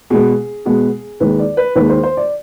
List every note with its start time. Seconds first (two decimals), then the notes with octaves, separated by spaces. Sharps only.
0.10 B2 G#3 B3 G#4
0.66 B2 G#3 B3
1.20 D#2 D#3 G#3 B4
1.39 D5
1.57 B4
1.76 D#2 D#3 G#3 B4
1.89 C5
2.03 C5
2.17 D5